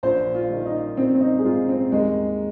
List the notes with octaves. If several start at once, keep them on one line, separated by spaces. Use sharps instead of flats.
A#1 C5
F4
D#3
D#4
A#1 C4
C4
D#4
G#4
G#2 F4
C4
D#2 G#3